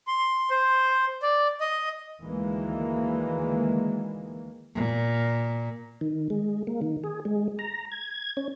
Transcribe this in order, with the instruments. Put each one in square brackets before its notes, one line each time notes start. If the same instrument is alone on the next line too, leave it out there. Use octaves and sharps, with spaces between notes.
[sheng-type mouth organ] C6
C5
D5
D#5
[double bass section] D2 D#3 E3 G#3 A#3
[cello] A#2
[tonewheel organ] D#3
G#3
A#3
D#3
G#4
G#3
A#5
G#6
C#4